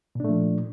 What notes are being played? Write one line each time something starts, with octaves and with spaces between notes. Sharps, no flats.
A#2 F3 A3 D4